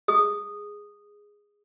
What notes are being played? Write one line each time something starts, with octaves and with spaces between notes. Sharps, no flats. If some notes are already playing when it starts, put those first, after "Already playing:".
G#4 D#6